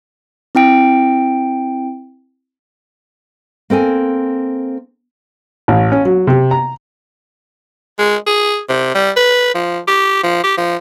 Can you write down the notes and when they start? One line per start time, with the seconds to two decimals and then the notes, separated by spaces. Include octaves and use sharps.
0.55 C4 E4 G5 D7
3.70 A#3 C4 A4 G#5
5.68 A1
5.92 C#4
6.05 F#3
6.27 C3
6.51 A#5
7.99 G#3
8.27 G#4
8.69 C3
8.95 G3
9.17 B4
9.55 F3
9.88 G4
10.23 F3
10.44 G4
10.57 F3